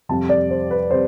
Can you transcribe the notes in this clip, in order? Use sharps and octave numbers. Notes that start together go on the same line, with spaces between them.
F2 C3 G3 A5
D5
C5
B4
C3 G3 C5